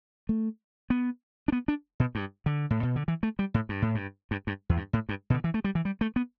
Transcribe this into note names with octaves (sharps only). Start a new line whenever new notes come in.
A3
B3
D4
B3
D4
B2
G2
D3
A2
B2
D3
E3
A3
G3
A2
G2
A2
G2
G2
G2
E2
G2
A2
G2
B2
D3
E3
A3
G3
E3
G3
A3
B3